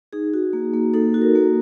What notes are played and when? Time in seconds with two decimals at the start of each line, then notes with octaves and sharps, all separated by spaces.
0.13 D#4 G#4
0.34 F#4
0.53 A#3
0.74 A#3
0.94 D#4 A4
1.14 F#4
1.22 A#4
1.35 A#3